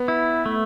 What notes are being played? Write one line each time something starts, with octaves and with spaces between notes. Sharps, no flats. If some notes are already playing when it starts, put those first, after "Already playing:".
Already playing: B3
E4
A3